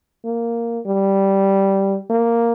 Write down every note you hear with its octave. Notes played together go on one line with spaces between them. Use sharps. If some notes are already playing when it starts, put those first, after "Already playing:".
A#3
G3
A#3